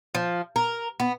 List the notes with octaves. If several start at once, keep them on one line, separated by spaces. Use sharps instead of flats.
F3
A#4
B3